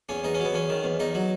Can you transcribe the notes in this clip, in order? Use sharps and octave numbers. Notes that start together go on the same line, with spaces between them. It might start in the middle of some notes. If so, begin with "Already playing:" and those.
E2 C#4
E2 D#4
C#4
F#3
B3
E2 C#4
D#3
E2
E2 D#4
F#3